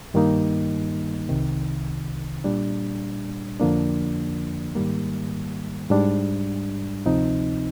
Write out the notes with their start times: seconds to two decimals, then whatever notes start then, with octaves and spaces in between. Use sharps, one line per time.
0.14 G2 D#3 G3 A#3 D#4
1.29 C2 C3 D#3
2.44 A#2 G3 D4
3.60 F2 D3 F3 A#3 D4
4.75 G#2 D#3 G3 A#3
5.90 G#2 G3 D4
7.06 D2 C3 F3 C4 D#4